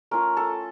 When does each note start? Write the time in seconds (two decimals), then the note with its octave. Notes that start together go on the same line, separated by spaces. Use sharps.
0.11 A3 C#4 F4 A#4
0.37 A4